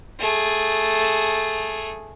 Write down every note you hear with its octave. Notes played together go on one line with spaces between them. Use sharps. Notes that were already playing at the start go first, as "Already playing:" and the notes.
A3 G#4